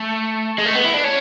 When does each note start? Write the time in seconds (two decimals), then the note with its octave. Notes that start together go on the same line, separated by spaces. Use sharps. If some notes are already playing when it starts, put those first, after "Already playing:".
Already playing: A3
0.58 G#3
0.65 A3
0.75 B3
0.85 E4
0.94 D4
1.04 C#4